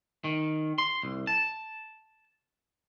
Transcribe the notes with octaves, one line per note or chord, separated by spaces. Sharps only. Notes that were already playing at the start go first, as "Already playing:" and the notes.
D#3
C6
C2
A5